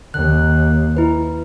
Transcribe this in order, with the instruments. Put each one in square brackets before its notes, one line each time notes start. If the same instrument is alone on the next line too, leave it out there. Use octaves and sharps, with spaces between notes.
[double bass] D#2 [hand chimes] F#6
[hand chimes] E4 B4